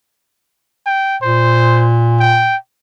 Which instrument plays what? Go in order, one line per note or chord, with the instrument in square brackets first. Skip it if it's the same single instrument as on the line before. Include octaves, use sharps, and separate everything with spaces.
[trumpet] G5
[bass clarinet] A#2 [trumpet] C5
[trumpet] G5